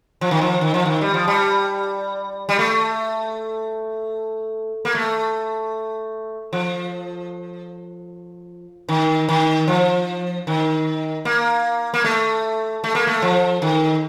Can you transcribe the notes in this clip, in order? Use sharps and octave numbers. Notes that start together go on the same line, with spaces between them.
F3
D#3
F3
D#3
F3
D#3
G3
F3
G3
G3
A3
A#3
A3
F3
D#3
D#3
F3
D#3
A#3
A#3
A3
A3
A#3
A3
F3
D#3